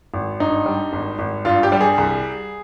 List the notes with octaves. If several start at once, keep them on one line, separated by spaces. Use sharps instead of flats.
G#1
G2 D#4
G3
G#1
G#1
G2 F4
G4
G3
G#4
C2